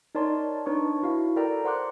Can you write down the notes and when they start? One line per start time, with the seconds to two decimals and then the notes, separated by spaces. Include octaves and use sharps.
0.15 D#4 A#4 C#5 D5 A5 C6
0.66 D4 D#4 B4 C#5 A5 C#6
1.03 E4 F#4 F5
1.36 A4 A#4 D5 G5 A#5
1.65 C5 F#5 C6 D6 F#6